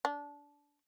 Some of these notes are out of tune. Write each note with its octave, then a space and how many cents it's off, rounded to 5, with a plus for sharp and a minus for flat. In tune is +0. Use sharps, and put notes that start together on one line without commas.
D4 -20